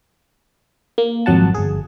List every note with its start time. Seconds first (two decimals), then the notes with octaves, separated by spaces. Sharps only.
0.98 A#3
1.26 G#1 F2 F#3 F#5 A5
1.55 G1 G#4